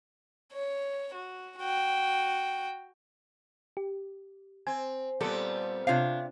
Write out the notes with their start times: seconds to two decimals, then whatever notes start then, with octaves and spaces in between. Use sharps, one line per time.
0.52 C#5
1.14 F#4
1.58 F#4 G5
3.77 G4
4.67 C4 G#5
5.21 A#2 G3 B3 C4 A4
5.87 C3 C4 D4 F4 C#5 F5